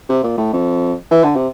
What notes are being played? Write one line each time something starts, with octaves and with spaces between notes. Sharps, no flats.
C3
A#2
A2
F2
E3
D3
C3